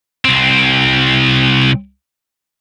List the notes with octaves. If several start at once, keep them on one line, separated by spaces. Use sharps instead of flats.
C2 C4